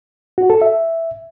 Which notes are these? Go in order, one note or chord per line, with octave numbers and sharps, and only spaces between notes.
F#4
A4
E5